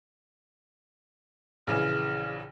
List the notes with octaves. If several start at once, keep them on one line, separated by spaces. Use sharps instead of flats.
A#1 C#3 E3 F6